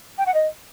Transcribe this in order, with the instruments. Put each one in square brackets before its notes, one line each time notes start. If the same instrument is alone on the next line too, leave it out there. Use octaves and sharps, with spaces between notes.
[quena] G5
F#5
D#5